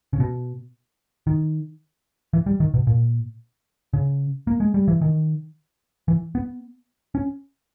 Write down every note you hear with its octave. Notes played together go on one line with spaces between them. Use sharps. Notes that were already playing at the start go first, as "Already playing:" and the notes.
C#3
B2
D#3
E3
G3
D#3
B2
A#2
C#3
A#3
G#3
G3
E3
D#3
E3
B3
C#4